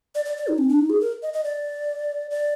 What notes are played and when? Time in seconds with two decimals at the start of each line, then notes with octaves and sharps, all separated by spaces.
0.15 D5
0.25 D5
0.37 D5
0.48 D#4
0.58 C4
0.69 D4
0.79 D#4
0.90 G#4
1.01 A#4
1.23 D#5
1.33 D#5
1.44 D5
2.31 D5